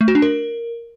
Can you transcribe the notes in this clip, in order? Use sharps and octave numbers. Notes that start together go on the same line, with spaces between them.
A3
F#4
D4
A#4